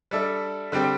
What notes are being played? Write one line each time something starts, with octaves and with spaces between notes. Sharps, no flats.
G3 D4 A4 E5
D3 G3 C4 G4